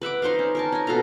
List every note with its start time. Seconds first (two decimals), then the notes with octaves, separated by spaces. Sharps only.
0.01 B4 E5 F#5 D6
0.22 D#4 C5 E5 F5
0.39 C#4
0.55 A#4 G#5 A5
0.72 C#4 G#5
0.87 B2 A4 F5 A#5